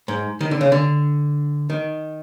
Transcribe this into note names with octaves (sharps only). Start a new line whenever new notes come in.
G#2
D#3
D3
C#3
D3
D#3